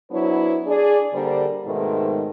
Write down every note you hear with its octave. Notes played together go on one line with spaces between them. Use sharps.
F#3 B3 D4 E4 C5 C#5
D4 G#4 D5
D3 G3 A#3 A#4 C5 D5
G#2 B2 D#3 G#3 A3 C4